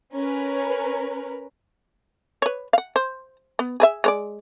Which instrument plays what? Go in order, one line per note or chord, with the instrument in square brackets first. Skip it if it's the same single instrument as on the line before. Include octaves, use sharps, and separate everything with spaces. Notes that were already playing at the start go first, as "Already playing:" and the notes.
[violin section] C#4 A#4 B4
[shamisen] B4 C#5
F5 F#5
C5
B3
G#4 B4 E5
G#3 C#5 D5